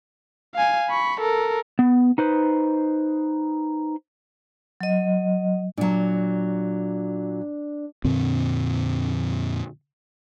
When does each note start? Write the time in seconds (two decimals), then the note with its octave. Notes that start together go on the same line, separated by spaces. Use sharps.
0.55 F5 G#5
0.90 B5 C#6
1.21 A4 A#4
1.79 B3
2.18 D#4 B4 C5
4.81 F#3 D#5
5.77 A#2 F#3 D4
8.04 F2 A#2 D3 C4